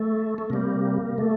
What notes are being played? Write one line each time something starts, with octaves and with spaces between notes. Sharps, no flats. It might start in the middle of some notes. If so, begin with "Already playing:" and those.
Already playing: A3
A3
C3 G3 A#3
A3